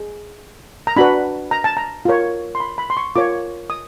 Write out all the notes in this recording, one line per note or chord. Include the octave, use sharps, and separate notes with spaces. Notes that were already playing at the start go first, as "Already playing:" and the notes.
Already playing: G#4
A#5
D4 F#4 B4 B5
A#5
A5
A#5
F4 A#4 C#5
C6
B5
B5
C6
C#6
F4 A#4 C#5 D6
D#6